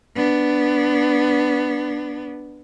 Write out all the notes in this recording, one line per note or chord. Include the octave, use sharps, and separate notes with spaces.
B3 D4